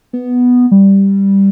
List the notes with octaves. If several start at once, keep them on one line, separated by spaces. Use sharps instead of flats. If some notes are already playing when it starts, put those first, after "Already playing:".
B3
G3